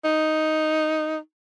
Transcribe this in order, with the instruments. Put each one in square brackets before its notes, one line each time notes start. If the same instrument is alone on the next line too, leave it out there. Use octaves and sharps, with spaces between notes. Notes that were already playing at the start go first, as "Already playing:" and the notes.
[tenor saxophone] D#4